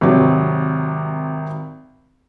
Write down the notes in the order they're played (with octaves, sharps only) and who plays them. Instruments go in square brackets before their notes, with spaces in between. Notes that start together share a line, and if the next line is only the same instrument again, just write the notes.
[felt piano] G#1 C3 F#3